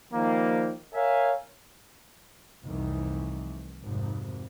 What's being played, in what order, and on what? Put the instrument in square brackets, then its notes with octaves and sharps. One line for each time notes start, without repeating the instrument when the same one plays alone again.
[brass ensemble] D#3 F3 G3 A#3
A#4 C#5 E5 F5 G#5
[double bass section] F1 C2 D#3 E3
G#1 F2 C3